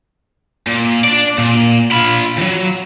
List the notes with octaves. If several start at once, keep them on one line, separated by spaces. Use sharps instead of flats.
A#2
D4 D5
A#2
F4 B5
D#2 F#3